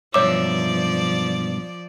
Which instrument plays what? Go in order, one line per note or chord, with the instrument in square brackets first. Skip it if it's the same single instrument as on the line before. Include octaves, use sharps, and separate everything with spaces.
[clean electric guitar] B1 G2 E5 [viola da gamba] F3 D5 [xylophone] C#5 D6